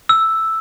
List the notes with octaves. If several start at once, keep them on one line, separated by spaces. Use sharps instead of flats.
E6